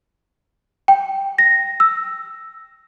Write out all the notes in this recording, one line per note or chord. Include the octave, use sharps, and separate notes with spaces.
G5
A#6
E6